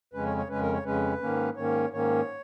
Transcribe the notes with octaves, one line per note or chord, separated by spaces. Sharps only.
F2 C#3 G#3 C#4 B4
C#5
C#5
F2 C#3 G#3 C#4 B4
A#4
C#5
F2 C#3 G#3 C#4 B4
G#2 D#3 A#3 C#4
G#2 D#3 A#3 C#4 C#5
G#2 D#3 A#3 C#4 C#5